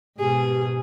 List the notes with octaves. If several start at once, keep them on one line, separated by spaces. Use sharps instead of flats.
G#2 B2 G4 G#4